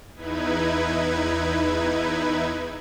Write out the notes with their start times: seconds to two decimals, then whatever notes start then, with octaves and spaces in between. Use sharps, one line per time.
0.15 E2 D#4 E4 B4 G#6